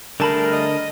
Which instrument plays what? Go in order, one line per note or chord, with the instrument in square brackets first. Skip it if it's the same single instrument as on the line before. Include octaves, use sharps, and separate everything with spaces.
[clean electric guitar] D3 A5 B5 [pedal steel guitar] G3 A3 G#4 [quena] A#4
[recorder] D#5